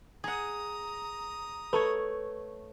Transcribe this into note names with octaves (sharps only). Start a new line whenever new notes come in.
G#4 F#5 A#5 D#6
A3 A4 B4 C#5